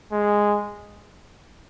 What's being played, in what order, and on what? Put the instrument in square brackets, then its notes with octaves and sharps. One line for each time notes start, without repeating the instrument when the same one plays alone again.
[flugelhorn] G#3